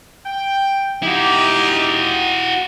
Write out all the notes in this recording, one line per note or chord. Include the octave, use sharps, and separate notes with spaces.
G5
D#4 E4 F#4 G4